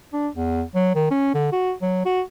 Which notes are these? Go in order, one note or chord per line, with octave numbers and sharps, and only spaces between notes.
D4
E2
F#3
D#3
C#4
D3
F#4
F#3
F#4